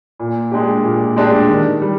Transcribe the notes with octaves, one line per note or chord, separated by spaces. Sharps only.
A#2
G#3 D4 G4
A#2
G#3 D4 G4
D#3
G3